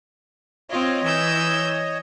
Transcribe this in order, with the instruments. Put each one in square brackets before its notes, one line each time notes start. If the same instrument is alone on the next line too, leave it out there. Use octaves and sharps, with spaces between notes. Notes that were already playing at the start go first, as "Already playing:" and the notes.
[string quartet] C4 F4 [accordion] C#5 D#5
[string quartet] E3 E6 G6